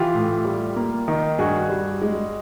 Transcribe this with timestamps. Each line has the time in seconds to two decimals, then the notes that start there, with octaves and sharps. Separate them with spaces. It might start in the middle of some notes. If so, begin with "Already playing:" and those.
Already playing: E3 F4 G4
0.15 A2
0.45 G3
0.76 A#3
1.08 D#3
1.38 G2 F#4 G#4
1.69 G3
2.02 G#3